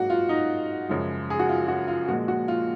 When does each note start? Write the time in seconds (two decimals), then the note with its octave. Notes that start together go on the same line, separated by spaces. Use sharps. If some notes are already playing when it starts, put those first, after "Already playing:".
Already playing: G#2 F#3 A#3 F#4
0.10 F4
0.29 D#4
0.89 F#2 C#3 F3 G#3
1.30 G#4
1.39 F#4
1.49 F4
1.68 F#4
1.88 F4
2.08 A#2 F3 G#3 F#4
2.28 F#4
2.48 F4